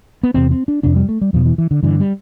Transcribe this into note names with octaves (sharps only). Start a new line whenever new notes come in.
B3
E2 C3 C4
C4
D4
F2 C3 D4
G3
A3
G3
E2 B2 F3
E3
E3
D3
G2 D3 E3
G3